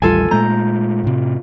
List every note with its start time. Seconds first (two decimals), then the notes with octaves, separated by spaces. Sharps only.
0.02 A1 D#2 G3 F4 A4 G#5
0.31 A#2 G#3 A3 A#5 G6
1.04 A2 C3